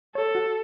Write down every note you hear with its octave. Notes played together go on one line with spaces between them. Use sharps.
A4 C#5
F#4